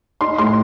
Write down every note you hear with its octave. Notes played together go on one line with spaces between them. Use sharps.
D#4 C6
A2 C6